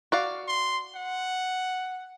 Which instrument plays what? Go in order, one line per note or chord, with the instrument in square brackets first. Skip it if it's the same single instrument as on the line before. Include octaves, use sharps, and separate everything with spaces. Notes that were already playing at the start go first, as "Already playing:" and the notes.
[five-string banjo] F#4 D5 F5
[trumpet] C6
F#5